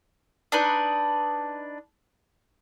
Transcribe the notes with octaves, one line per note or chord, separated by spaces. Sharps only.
D4 D#4 B4